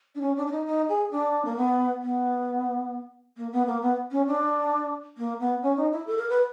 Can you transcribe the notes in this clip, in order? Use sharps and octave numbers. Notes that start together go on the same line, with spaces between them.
D4
C#4
D4
D4
D#4
D#4
G#4
D4
A#3
B3
B3
A#3
B3
A#3
B3
C#4
D4
A#3
B3
C#4
D#4
E4
A4
A#4
B4